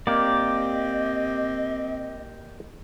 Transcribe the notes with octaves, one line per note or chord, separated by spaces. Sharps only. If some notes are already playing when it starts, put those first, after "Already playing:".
A#3 C4 G4 D5 D#5